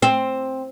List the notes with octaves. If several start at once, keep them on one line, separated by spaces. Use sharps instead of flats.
C4